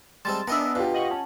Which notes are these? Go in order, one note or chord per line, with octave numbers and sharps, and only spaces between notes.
G3 G#3 C4 A5 C6 A6
B3 D4 A#4 D#5 E5 G#5 E6
B2 F4 G4
D#5 F#5 C#6 F#7
C#4 A5